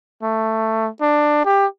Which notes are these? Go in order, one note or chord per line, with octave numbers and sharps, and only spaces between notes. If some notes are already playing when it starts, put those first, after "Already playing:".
A3
D4
G4